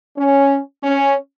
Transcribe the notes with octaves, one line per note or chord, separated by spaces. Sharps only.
C#4
C#4